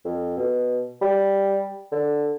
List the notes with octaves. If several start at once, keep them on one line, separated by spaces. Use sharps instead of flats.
F2
B2
G3
D3